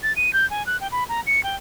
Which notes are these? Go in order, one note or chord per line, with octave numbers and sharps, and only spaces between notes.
A6
D#7
G6
G#5
F#6
G5
B5
A#5
C#7
G5